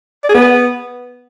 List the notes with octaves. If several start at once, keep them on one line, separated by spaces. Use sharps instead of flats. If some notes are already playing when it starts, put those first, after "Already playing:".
D5
G#4
B3